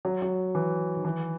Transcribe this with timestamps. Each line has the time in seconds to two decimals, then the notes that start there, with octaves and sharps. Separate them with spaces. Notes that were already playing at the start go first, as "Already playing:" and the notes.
0.05 F#3
0.22 F#3
0.55 E3
0.96 D#3
1.05 E3